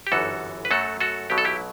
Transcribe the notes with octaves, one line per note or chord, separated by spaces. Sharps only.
G4
G1 F#2 E3 F#4 A4
B4
F#2 F#3 A3 F#4 A4
F#4 A4
B1 B2 F#3 G4
A4
E4 G4